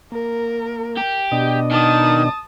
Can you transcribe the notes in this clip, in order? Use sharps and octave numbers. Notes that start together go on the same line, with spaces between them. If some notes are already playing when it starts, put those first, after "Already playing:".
A#3 A#4
G4
B2 D4 D#5
D#3 A5 D#6